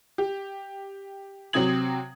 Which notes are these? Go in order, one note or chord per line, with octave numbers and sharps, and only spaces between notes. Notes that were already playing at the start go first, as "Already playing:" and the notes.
G4
C3 F#3 C4 D#6 G#6 F#7